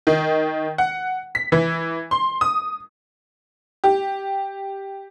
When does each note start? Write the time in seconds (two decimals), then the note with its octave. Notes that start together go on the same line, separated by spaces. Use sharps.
0.07 D#3
0.78 F#5
1.35 B6
1.52 E3
2.11 C6
2.41 D#6
3.84 G4